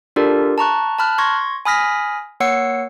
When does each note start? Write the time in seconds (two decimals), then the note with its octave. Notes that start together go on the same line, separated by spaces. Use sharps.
0.16 D4 F4 G4 A4 A#4 D5
0.58 A5 A#5 C#6 F#6
0.99 A5 B5 F6 F#6
1.18 C6 C#6 G#6 A#6
1.65 G#5 B5 D#6 F6 A#6 B6
2.40 A#3 C#5 F#5 E6 C7 C#7